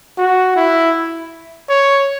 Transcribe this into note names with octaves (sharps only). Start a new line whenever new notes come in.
F#4
E4
C#5